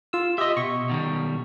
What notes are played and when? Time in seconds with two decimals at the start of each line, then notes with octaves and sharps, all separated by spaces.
0.13 F4 E6
0.38 G4 D#5 E5 C6
0.57 B2 C#6
0.89 B2 D#3 G3